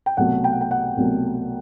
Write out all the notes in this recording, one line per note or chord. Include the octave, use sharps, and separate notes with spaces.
G5
C2 B2 F#3 A3 F#5
G5
F#5
G5
F#5
C2 B2 F#3 A3